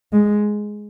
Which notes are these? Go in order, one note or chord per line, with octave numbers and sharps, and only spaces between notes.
G#3